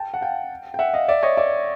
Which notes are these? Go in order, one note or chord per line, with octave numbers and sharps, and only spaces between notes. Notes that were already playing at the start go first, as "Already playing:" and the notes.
Already playing: G5 A5
F#5
F5 G5
G5
E5 F#5
D#5 F5
D5 E5
C#5 D#5
D5 E5